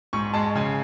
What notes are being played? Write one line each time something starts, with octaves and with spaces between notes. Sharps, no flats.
G#2 C#6
G#3 A5
C#3 G#5